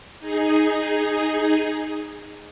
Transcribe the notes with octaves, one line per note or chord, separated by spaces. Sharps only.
D#4 G#4